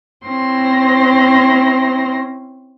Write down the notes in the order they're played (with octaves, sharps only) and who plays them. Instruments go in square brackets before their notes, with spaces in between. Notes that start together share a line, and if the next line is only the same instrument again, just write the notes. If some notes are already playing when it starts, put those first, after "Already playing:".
[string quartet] C4 C#4 E4 C6 A#6